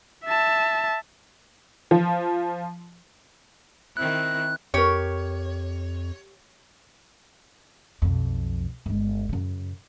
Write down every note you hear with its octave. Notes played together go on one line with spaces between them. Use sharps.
E5 A5
F3
D#3 C4 E4 F#6
F2 G4 A#4 C#5
B1 F2
G1 G#3
F#2 C#3